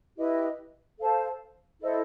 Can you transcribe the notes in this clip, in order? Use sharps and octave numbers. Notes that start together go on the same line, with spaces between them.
E4 G4 B4 D#5
A4 C5 F5 A5
E4 A4 C5 D#5